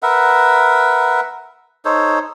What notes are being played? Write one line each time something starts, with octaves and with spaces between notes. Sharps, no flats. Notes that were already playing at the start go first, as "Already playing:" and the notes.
A#4 B4 E5 F#5
D#4 A4 C5 C#5